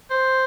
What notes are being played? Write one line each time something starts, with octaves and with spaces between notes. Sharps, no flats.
C5